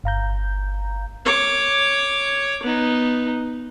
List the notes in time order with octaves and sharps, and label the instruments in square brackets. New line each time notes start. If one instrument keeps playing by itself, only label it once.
[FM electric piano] G1 F5 A#5 G6
[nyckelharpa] C#5 D6
B3 D#4